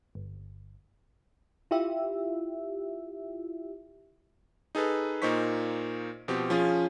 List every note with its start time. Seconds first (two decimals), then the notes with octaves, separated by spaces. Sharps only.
0.15 G1
1.71 E4 F4 G4 E5
4.75 D#4 G#4 A4 B4
5.22 A#2 A#3 D#4 C5 C#6 B6
6.28 B2 F3 C4 G4
6.50 F3 C#4 F4 G#4